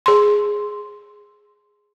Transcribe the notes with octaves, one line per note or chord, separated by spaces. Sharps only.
G#4 C6